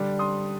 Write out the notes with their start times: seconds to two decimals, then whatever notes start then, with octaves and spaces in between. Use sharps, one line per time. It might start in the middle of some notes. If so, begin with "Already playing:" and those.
Already playing: D3 G3 D4
0.19 C6 D#6